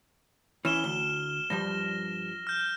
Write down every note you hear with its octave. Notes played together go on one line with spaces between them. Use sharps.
E3 C#4 F6 E7 G7
D2
G2 F3 G3 A#6
F6 G6